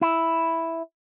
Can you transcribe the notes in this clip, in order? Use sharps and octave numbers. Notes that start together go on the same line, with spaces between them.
E4